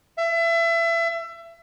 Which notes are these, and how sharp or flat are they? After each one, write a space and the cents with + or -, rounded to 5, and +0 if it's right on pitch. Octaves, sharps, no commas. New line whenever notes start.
E5 +30